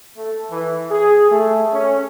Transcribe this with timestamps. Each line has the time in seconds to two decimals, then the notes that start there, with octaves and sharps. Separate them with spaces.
0.17 A3
0.50 E3
0.91 G#4
1.31 A3
1.73 C#4